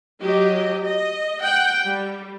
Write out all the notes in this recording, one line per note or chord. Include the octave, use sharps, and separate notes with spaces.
F#3 G4 D#5
D#5
F#5 G5
G3